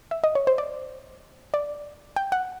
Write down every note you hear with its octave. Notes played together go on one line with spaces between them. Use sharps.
E5
D#5
C#5
C5
D5
D5
G5
F#5